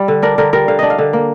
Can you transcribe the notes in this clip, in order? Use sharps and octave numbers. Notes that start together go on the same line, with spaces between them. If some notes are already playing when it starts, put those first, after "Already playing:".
Already playing: G3
D3
D4 A#4
D3 A#4
G3 A#4
D3 F5
D4 D#5
F5
D3
A#3